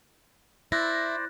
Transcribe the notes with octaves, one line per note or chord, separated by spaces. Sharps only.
E4 C5 D5 F#6 A6 A#6